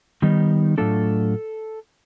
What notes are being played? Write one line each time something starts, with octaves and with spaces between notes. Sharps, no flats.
D#3 G3 B3 D#4
A2 F#3 A3 D4 F4 A4